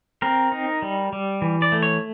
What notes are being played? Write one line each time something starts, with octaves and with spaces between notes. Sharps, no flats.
C4 A#4
D#4
G3
G3
E3
D5
A3
C#5